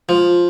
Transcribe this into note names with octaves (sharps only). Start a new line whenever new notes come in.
F3